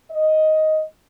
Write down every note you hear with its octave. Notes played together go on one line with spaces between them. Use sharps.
D#5